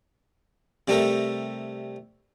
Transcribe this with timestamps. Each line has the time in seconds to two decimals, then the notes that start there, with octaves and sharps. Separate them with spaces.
0.88 C3 G3 A3 A4 A#4